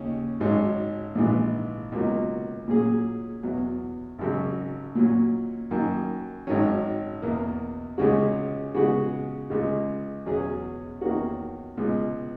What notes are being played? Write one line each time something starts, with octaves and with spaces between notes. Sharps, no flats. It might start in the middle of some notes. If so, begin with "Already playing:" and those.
Already playing: D#2 C#3 C#4
G#1 G#2 F#3 C#4
A#1 G#2 E3
C#2 B2 F#3 A#3
A#2 F#3 C#4 G#4
E2 B2 F#3
G#1 F#2 C#3
A#2 F#3 C#4
F#2 D#3 A#3
G#1 G#2 D#3 F#3 C#4
E2 B2 A#3
C#2 C#3 G#3 C#4 F#4
C#3 G#3 B3 F#4
C#2 C#3 G#3
E2 B2 F#3 C#4 G#4
E2 D#3 A#3 C#4 F#4
C#2 B2 G#3